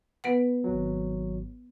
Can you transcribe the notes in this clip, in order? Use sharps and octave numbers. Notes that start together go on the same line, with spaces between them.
B3 B4 F#5
G#1 F#3